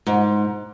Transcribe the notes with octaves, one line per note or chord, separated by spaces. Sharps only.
G#2